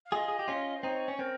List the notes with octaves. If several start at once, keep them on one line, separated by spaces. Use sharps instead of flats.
F5
F4 G#4 D#5
G#4
G4
C#4 F4
C5
C4 D#4 C#5
C#4
C4 A#4